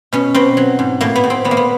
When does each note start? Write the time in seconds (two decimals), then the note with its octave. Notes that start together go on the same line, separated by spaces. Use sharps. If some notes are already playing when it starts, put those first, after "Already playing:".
0.12 B2 C#4
0.34 B2 C4
0.57 F#3
0.79 G#2
1.01 A2 A#3
1.16 B3
1.24 A2
1.30 C4
1.45 A#2 B3
1.51 A#3
1.57 B3